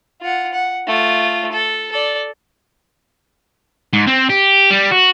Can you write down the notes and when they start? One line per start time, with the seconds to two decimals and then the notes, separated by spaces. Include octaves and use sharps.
0.21 F4 F#5
0.53 F#5
0.87 A3 F4
1.52 A4
1.92 A4 D5
3.93 G#2
4.07 C4
4.29 G4
4.71 G3
4.92 F#4